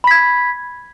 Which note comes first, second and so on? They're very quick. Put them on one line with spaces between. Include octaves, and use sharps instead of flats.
B5 B6 G#6